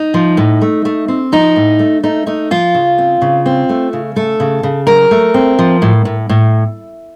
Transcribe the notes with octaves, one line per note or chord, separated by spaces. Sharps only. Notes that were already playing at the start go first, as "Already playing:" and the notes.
Already playing: D#4
F3
A2
A3
A3
C4
F3 D#4
A2
A3
A3 D#4
A3 D#4
F3 F4
C#3
C4
C#3
C4
A3
C#3
A3 A4
C#3
C#3
F#3 A#4
A3
C4
F3
A2
A2
A2